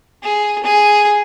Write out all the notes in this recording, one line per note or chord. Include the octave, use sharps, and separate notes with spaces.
G#4
G#4